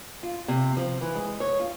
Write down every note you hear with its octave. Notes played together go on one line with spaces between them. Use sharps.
F4
C3
F3
E3
G#3
C#5
F4